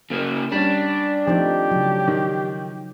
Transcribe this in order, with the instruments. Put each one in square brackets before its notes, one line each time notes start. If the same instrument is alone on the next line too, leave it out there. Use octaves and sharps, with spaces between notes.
[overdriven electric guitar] C#3 A#3
[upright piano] G3 C#4 [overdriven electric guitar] D4
[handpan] F3 D#4 [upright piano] A3 C4 [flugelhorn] G4
[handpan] C#3 F#3
[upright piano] D#3